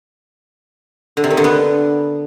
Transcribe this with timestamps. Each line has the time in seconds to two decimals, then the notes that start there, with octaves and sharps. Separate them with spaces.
1.17 D3
1.24 C3
1.30 D#3
1.37 D3
1.44 B3